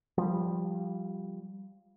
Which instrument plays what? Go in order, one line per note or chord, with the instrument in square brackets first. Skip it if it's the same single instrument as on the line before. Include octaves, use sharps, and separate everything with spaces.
[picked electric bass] F3 G3